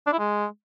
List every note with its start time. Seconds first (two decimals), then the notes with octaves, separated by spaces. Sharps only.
0.07 D4
0.13 E4
0.19 G#3